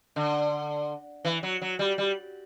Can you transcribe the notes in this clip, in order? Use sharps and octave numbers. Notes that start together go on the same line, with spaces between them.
D3
E3
F#3
F#3
G3
G3